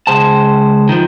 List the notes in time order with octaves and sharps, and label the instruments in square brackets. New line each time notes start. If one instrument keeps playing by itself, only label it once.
[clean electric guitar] C#2 G#3 C5 A5
D#3 F3